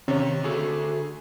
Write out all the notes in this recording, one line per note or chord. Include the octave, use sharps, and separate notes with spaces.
C3 D#3 C#4 G4 C#5
D3 F#4 G#4 A4